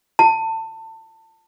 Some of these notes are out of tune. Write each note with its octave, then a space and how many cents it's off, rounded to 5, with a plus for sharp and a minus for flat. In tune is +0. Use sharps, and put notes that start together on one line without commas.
A5 +25